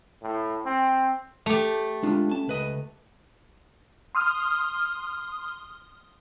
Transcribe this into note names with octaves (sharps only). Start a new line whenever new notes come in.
A2
C4
A3 G4
G#3 D4 F4
C#4 A5
C#2 B4 D#5
C6 D#6 F6